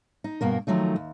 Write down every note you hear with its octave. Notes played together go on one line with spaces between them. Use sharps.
D#4
G2 B2 A#3 A#4
D#3 F3 F#3 A3 D#4
D#2